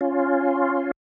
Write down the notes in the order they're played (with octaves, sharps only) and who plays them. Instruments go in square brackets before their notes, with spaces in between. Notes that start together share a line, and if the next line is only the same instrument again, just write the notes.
[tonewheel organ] C#4 F4